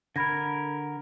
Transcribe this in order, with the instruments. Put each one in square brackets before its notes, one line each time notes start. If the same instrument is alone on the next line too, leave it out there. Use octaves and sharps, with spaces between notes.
[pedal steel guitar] D3 A#4 [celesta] B5 G#6 A#6